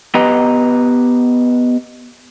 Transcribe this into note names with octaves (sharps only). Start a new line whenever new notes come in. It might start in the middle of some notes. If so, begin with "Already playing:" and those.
B3 G4 B4 D#5 A#5